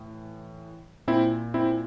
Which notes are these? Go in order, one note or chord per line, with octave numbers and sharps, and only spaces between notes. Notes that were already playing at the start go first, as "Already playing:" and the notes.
Already playing: A2 E3
A#2 C4 E4
C4 E4